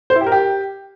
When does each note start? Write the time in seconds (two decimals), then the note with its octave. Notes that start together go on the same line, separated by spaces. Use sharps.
0.10 C5
0.16 E4
0.21 G4
0.26 A#4
0.32 G4